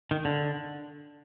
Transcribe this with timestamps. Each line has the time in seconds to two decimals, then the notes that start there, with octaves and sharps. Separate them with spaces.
0.11 D#3
0.25 D3